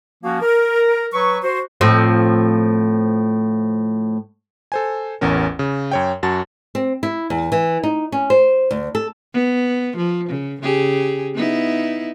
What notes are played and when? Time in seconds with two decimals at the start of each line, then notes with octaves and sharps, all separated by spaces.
0.24 F3 A#3 C#4 F#4
0.42 A#4
1.13 F#3 B4 C#6
1.44 F#4 C5
1.81 A2 F3 C4
4.72 A4 C5 G#5
5.21 A1 E2 C#4 A#4
5.59 C#3
5.91 F#2 C#5 G5
6.23 F#2 F#4 A5 A6
6.75 C4
7.03 E4
7.30 E2
7.52 E3
7.83 D#4
8.12 C#4
8.30 C5
8.71 D2
8.95 A4
9.33 B3
9.97 F3
10.29 C#3
10.62 C#3 G4 G#4
11.34 B3 D#4 E4